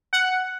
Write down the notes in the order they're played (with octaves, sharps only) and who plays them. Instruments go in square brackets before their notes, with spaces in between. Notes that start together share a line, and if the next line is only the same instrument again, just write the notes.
[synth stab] F#5